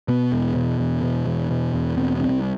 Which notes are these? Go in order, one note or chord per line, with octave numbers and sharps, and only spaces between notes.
B2 B3
E2
B2
E2
B2
E2
B2
E2
B2 C4
C2 C4